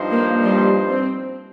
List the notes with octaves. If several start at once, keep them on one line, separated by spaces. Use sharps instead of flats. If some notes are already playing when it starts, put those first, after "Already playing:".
Already playing: G2 F3 D#4 C5
A#3
G3
C4